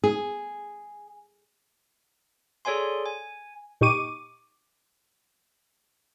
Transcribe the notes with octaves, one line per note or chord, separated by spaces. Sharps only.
G#4
G#4 A4 C#5 D5 G#5 C6
G#5
A#2 D#4 G4 C#6 D6 D#7